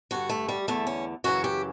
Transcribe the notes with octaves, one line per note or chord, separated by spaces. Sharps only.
G2 D3 F#4
A3
G3
E2 D3 A3
C#4
F#2 C#3 E3 F#4
G4